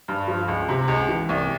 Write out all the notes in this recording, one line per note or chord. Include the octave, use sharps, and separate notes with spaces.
G2
F3
C#2
C3
C#2
E3
C2